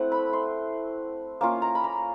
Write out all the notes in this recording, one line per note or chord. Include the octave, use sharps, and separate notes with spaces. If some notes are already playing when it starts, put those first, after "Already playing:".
Already playing: A3 C4 E4 F#5
B5
C6
A#3 C#4 F4
A#5
B5
A#5